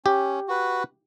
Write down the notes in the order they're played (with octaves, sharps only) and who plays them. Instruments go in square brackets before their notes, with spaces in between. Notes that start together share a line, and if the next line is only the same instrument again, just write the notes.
[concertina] C#4 [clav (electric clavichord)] G4
[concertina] F#4 B4